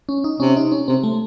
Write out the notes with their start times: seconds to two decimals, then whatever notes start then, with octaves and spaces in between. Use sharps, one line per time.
0.09 C#4
0.24 D#4
0.40 C3 C#4
0.57 D#4
0.72 C#4
0.88 C3 C4
1.03 A3